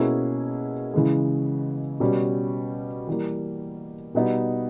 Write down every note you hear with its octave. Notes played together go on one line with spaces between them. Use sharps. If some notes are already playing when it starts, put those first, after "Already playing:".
Already playing: B2 A#3 C#4 E4 G#4
C#3 E3 G#3
B2 G3 C#4
E3 G3 A#3
B2 G3 B3 D#4